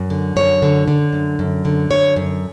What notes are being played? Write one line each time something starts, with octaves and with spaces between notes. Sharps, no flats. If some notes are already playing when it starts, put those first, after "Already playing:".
Already playing: F#2
D3
F#2 C#5
D3
D3
F#2
F#2
D3
F#2 C#5
F#2